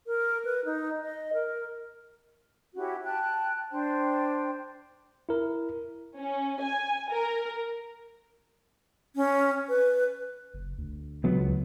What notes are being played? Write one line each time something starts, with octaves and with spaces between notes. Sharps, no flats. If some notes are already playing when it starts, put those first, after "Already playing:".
A#4
B4
D#4
D#5
A#4
C#4 E4 F#4 G4
G5 A5 F#6
D4 C5 G5
E4 A#4
C#4
G#5
A#4
C#4
B4
F#1
D2
C#2 F#3 B3